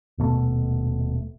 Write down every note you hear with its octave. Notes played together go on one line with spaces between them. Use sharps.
D#1 B2 A3